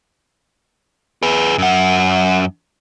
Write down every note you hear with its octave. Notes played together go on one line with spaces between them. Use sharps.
G#4 B4
F#2 F#5